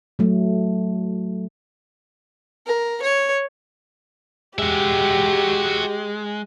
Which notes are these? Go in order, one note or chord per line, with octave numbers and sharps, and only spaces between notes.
F#3 A3
A#4
C#5
G#3 F#4 G4 E5